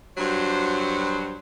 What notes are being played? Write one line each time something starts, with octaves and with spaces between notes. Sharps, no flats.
G2 F#3 C5